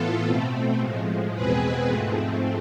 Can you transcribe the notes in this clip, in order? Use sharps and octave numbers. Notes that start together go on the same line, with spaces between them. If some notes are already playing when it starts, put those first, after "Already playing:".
Already playing: A2 E3 B3 F4 A4
B2 A3 C4
A2 F3 G#3
E2 B2 G#3 C4 G#4 B4
G#2 F3 A3 C4